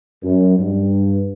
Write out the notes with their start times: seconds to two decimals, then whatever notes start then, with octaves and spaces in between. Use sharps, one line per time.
0.23 F#2
0.58 G2